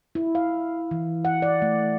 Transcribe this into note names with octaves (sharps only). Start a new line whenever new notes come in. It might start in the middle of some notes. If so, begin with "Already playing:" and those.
E4
F5
E3
F#5
D5
A3